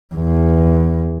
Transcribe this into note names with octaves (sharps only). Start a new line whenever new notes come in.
E2